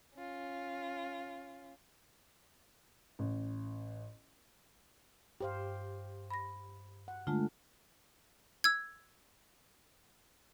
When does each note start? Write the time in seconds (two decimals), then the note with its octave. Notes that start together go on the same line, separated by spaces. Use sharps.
0.15 C#4 F4
3.19 A1
5.41 G2 G4 C5 F5
6.30 B5 A#6
7.08 F#5
7.27 D3 G#3 A3 F4
8.64 E6 G#6